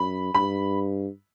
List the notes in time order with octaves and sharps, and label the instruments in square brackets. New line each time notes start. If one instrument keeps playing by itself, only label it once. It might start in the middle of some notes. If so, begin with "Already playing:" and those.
Already playing: [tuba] F#2 [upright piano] B5
[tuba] G2 [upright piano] B5